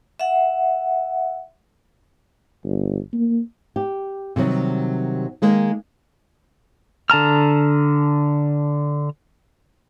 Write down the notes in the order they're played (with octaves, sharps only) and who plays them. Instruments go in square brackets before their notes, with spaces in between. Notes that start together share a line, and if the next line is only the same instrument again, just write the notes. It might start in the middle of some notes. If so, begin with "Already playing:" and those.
[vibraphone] E5 F#5
[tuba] G1
A#3
[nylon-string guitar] G4
C3 D#3 F#3 G3
D#3 G#3 A#3
[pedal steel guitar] D3 A5 A#5 F6